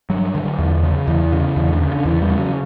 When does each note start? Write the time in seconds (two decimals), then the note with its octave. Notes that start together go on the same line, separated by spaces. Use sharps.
0.10 G2 F#3
0.35 D3
0.59 E2
0.83 C#3
1.07 E2 E3
1.32 C#3
1.56 E2 E3
1.68 D3
1.81 C#3
1.91 D3
2.05 E2 E3
2.21 G3
2.29 C#3
2.38 F#3